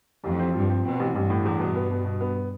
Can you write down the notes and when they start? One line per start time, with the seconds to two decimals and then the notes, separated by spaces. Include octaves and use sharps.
0.24 A1 F2
0.39 C4
0.54 G2 F3
0.70 C4
0.85 B2 C4
1.00 A1
1.15 A1 G2
1.30 A2
1.45 E2
1.59 B2
1.76 B3
1.91 B2
2.05 B2
2.21 B3